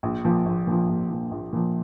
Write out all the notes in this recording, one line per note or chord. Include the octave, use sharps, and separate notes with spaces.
A#1
A#2 F3
A#1
A#2 F3
A#1
A#2 F3
A#1
A#2 F3